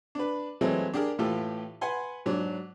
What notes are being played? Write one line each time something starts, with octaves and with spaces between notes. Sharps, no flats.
D4 B4
E3 F#3 G#3 A3 C4
D4 G4 G#4 A#4
A2 E3 A3 F4 G4
B4 F#5 G#5 C6
G#2 F#3 D4